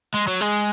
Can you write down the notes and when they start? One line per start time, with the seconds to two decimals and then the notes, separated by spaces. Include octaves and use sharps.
0.14 G#3
0.28 F#3
0.41 G#3